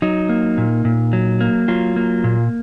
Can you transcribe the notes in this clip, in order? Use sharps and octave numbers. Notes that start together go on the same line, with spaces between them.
F#3 D#4
A#3
A#2
A#2
F#3
A#3
F#3 F4
A#3
A#2